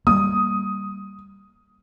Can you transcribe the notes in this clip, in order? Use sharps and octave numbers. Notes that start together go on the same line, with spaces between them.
G3 G#3 A#3 D#6